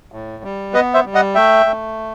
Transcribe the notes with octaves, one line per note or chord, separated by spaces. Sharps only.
A2
G3
B3 B4 D#5
C5 E5
G3
D#5 F#5
A3 E5 G5
A3